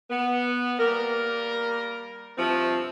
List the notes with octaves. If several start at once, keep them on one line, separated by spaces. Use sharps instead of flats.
B3
G3 A#3 A#4
G2 C3 F3 A3 C4